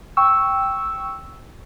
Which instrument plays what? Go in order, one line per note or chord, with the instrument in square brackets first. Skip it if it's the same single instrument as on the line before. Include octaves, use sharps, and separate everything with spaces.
[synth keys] G5 C#6 E6